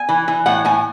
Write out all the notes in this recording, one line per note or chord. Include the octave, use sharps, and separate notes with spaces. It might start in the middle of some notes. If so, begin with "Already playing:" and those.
Already playing: G#5
E3
E3
A2 F#5
A2 G#5